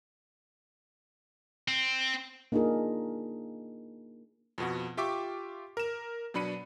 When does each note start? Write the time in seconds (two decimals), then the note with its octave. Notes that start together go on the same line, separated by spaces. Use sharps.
1.68 C4
2.52 A#3 D4 D#4 F4 G#4 A#4
4.58 F2 B2 F#4
4.97 F4 G4 E5 G5 C#6 D6
5.77 A#4 E7
6.34 B2 F#3 D4 B5 C#7 D#7